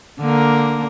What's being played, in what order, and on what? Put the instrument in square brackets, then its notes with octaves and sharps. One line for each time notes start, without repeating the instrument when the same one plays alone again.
[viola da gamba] D3 A#3 A#4